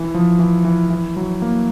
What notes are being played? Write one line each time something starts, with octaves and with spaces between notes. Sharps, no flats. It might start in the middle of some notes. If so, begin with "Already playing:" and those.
Already playing: E3
F3
E3
E3
E3
F#3
A#3